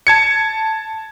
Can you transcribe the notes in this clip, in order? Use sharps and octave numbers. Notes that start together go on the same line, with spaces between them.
A5 G#6 C#7